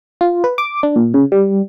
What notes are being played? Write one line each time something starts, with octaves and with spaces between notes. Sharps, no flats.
F4
B4
D6
D4
A#2
C#3
G3